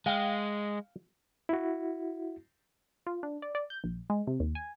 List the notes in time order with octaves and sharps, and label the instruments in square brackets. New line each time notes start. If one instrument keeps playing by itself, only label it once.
[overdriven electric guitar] G#3 [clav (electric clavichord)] F5 G5
[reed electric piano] E4 F#4
[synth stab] F4
D4
D5
D5
G6
A#1
G#3
C3
D#2
G#5